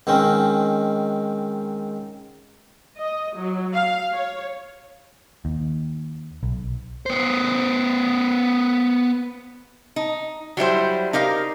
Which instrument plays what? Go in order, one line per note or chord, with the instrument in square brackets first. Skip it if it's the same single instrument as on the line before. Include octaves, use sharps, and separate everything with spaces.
[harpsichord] G#2 D#3 C4 C#4
[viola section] D#5
F#3
F5
C#5
[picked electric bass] D#2
B1
[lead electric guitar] B3 C5
[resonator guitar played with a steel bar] D#4
F#3 G3 E4 C5
D#4 G4 A#4 F5